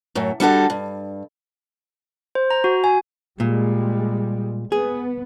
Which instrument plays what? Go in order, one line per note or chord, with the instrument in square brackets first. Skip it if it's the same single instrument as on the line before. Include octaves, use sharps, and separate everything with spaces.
[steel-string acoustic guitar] F#2 A2
G3 D4 F#4 A4
G2
[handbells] C5
A#5
F#4
G#5
[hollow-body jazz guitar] A#2 [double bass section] G3 G#3
[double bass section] B3 [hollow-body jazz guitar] G#4